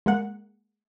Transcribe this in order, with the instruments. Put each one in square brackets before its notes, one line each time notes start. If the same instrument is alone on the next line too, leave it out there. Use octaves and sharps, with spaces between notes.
[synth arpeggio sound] G#3 A#3 F#5